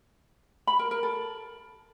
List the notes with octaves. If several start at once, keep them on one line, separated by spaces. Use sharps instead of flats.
B5
A#4
A#4
A4